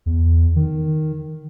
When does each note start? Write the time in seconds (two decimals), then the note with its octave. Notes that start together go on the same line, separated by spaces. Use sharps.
0.06 E2
0.56 D#3